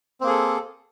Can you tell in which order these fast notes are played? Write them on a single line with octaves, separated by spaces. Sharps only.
C4 A#3 G#4 A4